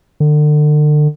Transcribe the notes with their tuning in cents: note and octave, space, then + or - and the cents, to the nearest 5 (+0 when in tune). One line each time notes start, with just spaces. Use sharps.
D3 +35